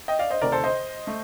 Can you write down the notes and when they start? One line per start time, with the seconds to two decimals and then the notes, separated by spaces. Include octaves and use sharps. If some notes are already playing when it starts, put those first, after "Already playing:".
0.08 D#5 G5
0.19 D5 F5
0.30 C5 D#5
0.41 D2 C3 D#3 A#4 D5
0.52 A4 C5
0.64 C5 D#5
1.07 A3